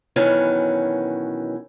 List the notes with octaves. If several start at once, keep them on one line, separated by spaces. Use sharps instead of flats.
B2 D#3 E3 F#3 C#4 B4